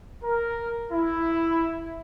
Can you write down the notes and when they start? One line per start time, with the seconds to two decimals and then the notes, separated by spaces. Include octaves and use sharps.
0.24 A#4
0.92 E4